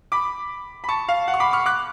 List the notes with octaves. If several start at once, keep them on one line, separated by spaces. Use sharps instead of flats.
B5 D6
B5
A5 C#6
F5
F#5
C#6
B5 D6
C#6 F6
D6 F#6